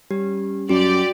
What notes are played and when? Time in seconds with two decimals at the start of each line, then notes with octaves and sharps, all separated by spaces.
0.11 G3 C#4 G4
0.69 F#2 F#4 G4 D5